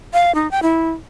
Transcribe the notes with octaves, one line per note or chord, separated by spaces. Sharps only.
F5
D#4
G5
E4